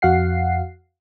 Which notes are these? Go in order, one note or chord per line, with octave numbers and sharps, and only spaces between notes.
F2 F#4 F5 F#5 C7